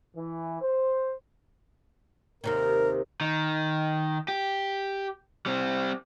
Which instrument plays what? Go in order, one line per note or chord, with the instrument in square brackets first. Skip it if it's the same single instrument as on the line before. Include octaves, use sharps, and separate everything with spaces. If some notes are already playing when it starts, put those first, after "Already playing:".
[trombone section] E3
C5
[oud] D#2 C3 D#3 [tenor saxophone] A#4
[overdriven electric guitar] D#3
G4
G3 C4